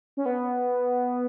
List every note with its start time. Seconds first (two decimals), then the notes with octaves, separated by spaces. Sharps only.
0.17 C#4
0.26 B3